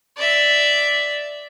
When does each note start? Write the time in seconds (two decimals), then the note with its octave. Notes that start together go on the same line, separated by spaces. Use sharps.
0.17 D5 E5